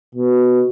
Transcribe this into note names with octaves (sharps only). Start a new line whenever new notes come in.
B2